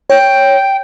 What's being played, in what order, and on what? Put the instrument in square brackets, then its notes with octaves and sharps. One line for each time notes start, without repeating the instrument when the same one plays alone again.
[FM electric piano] C#5 [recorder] G5